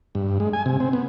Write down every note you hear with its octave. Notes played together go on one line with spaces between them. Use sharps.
G2
G#3
G#5
C3
C4
B3